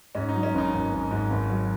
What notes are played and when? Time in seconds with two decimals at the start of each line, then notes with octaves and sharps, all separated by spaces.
0.15 G#2 C#4
0.29 D#4
0.34 F#3
0.43 C#4
0.53 G#1 D#4
0.72 G#1
0.92 G#1
1.11 G#2
1.30 G#1
1.50 F#3